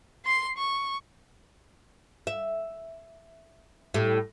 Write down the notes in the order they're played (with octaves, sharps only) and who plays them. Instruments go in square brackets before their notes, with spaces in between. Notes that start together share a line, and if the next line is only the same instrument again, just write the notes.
[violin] C6 C7
C#6
[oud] E5
A2 G3